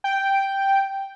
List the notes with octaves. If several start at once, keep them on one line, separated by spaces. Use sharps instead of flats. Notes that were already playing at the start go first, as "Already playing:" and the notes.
G5